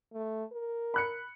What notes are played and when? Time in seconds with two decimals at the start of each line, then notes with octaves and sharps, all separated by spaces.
0.13 A3
0.52 A#4
0.94 B5 F#6 C#7